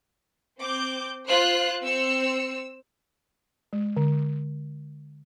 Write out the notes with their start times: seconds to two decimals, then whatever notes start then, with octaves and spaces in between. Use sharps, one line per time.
0.59 C4 D6 G6
1.27 F4 C5 F#6
1.85 C4 E6 C#7
3.73 G#3
3.97 D3